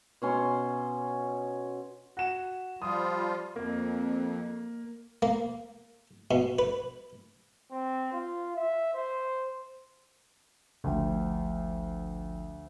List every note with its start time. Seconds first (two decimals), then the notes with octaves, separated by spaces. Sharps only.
0.22 B2 C#4 C6
2.17 F#4 E7
2.82 F3 G3 F4 D#6
3.56 F2 A#3
5.22 A#3
6.31 B2
6.59 B4
7.72 C4
8.13 F4
8.56 E5
8.94 C5
10.84 G#1 D2 F3 G5